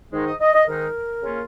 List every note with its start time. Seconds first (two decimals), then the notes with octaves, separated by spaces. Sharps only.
0.12 G#2 D#3 G#3 D#4
0.26 D#5
0.40 D#5
0.54 D#5
0.67 G#2 D#3 G#3 D#4 A#4
1.22 C#3 A#3 C#4 F4